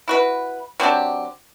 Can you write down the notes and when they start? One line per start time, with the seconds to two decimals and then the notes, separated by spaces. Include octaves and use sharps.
0.08 E4 F#4 B4
0.80 F#3 C4 D4 G4